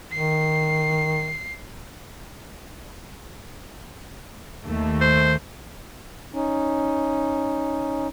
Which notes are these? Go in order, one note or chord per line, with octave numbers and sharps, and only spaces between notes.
D#3 C7
D#2 A3
C5
C#4 D#4